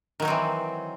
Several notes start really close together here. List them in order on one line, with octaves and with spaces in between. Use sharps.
D#3 F#3 D#4 C4 E3